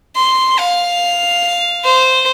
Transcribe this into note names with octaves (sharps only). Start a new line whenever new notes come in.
C6
F5
C5